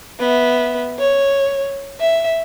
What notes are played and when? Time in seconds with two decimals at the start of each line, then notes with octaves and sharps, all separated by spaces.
0.20 B3 E5
0.99 C#5
2.00 E5